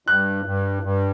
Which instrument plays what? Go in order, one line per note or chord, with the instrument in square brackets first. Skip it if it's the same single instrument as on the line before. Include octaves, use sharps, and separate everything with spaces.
[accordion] G2 [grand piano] F#6
[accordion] G2
G2